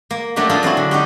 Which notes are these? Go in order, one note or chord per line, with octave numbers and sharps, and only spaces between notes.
A#3
F#3 A3 A#3 D4 G4
D4 F4 G#4 A4 F5
F#3 C4 E4 F#4
D3
D#4 F#4 G4